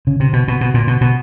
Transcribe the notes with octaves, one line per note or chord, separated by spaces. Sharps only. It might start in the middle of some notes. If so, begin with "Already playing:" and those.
C#3
C3
B2
B2
B2
A#2
B2
B2